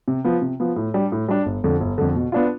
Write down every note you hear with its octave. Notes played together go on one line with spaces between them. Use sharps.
C3
F3 B3
C3
F3 B3
A2
G3 D4
A2
G3 D4
G1
F2 D3
G1
F2 D3
B2
B3 D4 F4